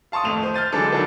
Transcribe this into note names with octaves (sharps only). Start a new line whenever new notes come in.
F5 A5 C6 C#6 D#6
D#1 F2 A3 D#7 F7
C5
F6 G6 A6 D#7
D3 E3 F#3 G#3 D4 A4
D#3 F#3 D4 F4 A4 B4